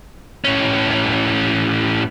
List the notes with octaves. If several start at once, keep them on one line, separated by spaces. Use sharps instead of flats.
A2 C#4